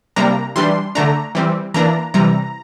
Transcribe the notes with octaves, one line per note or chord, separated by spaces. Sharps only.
C3 G3 A#3 D4 A#5
E3 G3 D4 C6
D3 A3 D4 A#5
E3 G3 C4
E3 A#3 D4 A#5
C3 E3 G3 A#5